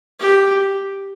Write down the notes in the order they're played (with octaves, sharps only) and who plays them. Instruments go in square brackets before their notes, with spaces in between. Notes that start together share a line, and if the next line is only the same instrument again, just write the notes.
[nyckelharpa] G4